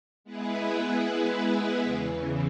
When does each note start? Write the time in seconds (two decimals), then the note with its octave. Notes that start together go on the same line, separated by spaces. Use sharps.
0.24 G#3 B3 E4 G#4 B4
1.82 E2 C#3 E3